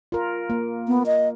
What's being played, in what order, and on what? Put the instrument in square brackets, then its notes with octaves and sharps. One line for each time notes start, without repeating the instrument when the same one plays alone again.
[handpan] F4 A#4
A#3
[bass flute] B3
D#5